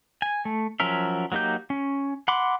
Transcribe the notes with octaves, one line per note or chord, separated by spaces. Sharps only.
G#5
A3
F3 F#3 C#4 A#4 E5
F#3 A#3 D#4 G4 G6
C#4
F#5 B5 C6 D6